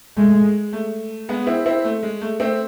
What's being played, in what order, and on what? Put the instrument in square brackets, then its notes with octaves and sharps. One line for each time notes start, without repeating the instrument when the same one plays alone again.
[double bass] G#3 [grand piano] A3
[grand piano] G#3
A3
G#3 B3
C4 E4
C4 E4
A3
G#3
A3
A3 C4